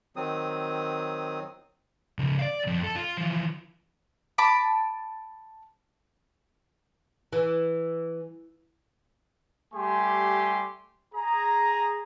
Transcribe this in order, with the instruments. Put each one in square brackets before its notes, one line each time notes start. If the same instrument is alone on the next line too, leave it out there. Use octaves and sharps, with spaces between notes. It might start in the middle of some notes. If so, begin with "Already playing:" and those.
[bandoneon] D#3 F#3 C4 D#6
[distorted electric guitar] C#3 F3
D5 F5
F2
A4
F4
E3 F3
[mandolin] A5 B5 D6
[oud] E3
[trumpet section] G3 A3 G4 G#5 C6
G#4 A#5